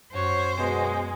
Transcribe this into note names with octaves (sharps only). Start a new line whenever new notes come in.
F#2 F#4 C5 C#5 C7
B2 G#3